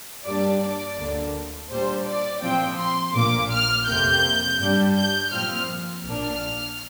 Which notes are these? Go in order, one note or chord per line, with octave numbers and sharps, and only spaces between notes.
G2 G3 A#3 D4 D5
D5
D2 D3 A#3 D4
A#2 G3 D4 C5
D5
A#2 F3 C4 G5
C6
A#1 A#2 A#3 D6
F6
F2 C3 A#3 G6
G2 G3 D4
G6
A#2 F3 C4 F6
A#1 A#2 A#3 D4 F6